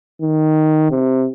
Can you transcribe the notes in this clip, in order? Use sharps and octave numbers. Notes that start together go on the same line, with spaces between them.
D#3
C3